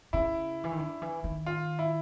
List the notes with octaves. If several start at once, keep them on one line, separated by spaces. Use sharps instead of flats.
C#3 E4
E3
D#3
D3
E3
D#3
F4
E4